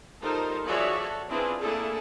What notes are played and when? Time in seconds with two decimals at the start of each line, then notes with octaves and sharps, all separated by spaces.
0.21 G3 D#4 F4 A4 A#4 C5
0.64 F3 F#4 G#4 C#5 D5 E5
0.99 F#4 A4 C#5
1.28 C4 D4 E4 F4 G#4 B4
1.60 A3 A#3 D4 E4 G#4 A4